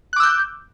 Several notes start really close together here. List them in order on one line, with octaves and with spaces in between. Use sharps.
F#6 D6 E6 G6